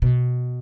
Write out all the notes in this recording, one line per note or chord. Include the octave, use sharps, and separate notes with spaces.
B2